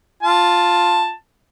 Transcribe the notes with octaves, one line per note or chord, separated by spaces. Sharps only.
F4 A5